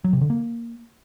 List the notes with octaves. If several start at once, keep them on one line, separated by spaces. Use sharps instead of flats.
F#3
C3
D3
A#3